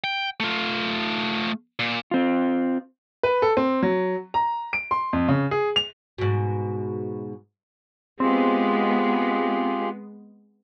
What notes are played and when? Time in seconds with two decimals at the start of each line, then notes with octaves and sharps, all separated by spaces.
0.04 G5
0.40 A3 F4
1.79 A#2
2.11 C4 F4
3.23 B4
3.42 A4
3.57 C4
3.83 F#3
4.34 A#5
4.73 D7
4.91 C6
5.13 F2
5.28 C#3
5.51 G#4
5.76 F7
6.18 G#2 B2
8.20 G#3 B3 C4 F4 G4 G#4